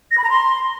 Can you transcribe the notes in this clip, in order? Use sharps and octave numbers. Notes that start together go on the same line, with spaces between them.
A#6
B5
A#5
C6